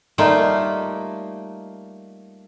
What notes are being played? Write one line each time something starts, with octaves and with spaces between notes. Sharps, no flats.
G3 A3 A#3 D#4 F4